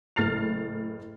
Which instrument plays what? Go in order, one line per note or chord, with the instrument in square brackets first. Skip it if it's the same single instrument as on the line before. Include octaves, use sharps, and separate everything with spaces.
[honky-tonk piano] F#1 A2 F6 A6 C7 F7